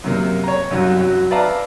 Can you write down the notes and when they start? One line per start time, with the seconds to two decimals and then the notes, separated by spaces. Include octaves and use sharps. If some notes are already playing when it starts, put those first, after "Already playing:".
0.04 F#2 C3 A#3
0.44 C#5 A#5
0.71 C2 F#2 F#3
1.01 F#3
1.30 B4 D5 E5 F5 A5 A#5